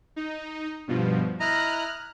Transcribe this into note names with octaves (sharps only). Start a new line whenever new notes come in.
D#4
G2 B2 F3
E4 D#5 A#5 F6 F#6